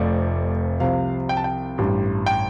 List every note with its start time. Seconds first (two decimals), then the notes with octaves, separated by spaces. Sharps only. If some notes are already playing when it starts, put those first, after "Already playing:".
Already playing: F1 F2 F3 A3 D5
0.80 C2 C3 F3 F5
1.29 G5
1.37 A5
1.44 G5
1.78 A1 G2 G3
2.26 G5